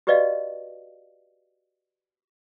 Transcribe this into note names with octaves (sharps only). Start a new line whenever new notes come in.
F#4 G4 B4 D5 D#5 F5